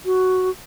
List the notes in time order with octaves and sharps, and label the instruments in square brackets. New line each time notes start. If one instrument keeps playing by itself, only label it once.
[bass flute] F#4